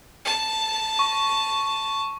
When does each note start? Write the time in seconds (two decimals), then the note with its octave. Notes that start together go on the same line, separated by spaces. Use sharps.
0.25 A5
0.99 C#6